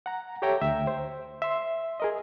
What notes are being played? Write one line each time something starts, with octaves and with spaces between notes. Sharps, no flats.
F#5 A#5
G4 A4 C#5 E5 G5 A#5
D2 E5 G5
C5
E5 C6
G#4 A#4 D#5